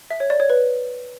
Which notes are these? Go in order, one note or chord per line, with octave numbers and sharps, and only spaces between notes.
E5
C#5
D5
C#5
B4